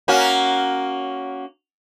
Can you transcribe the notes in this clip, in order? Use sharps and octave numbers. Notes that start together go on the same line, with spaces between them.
A#3 C#4 F#4